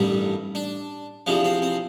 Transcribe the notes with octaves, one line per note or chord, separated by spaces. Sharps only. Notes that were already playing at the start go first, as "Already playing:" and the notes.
Already playing: A1 G2 D#3 G3 D4
D4
E2 C3 F3 D4
C4
C4